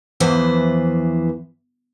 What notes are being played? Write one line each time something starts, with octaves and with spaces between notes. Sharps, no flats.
E2 E3 F3 B4 C5